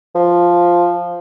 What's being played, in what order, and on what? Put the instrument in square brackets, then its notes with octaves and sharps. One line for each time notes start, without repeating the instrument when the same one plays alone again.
[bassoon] F3